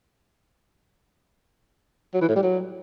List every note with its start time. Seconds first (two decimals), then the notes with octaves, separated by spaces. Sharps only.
2.14 F#3
2.21 E3
2.28 A2
2.36 G3
2.43 F#3